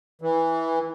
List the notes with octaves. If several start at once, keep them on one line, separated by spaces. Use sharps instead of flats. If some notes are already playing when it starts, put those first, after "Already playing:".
E3